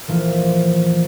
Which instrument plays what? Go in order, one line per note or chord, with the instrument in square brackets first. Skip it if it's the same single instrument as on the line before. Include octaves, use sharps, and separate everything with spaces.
[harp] A#1 E3 F3 F4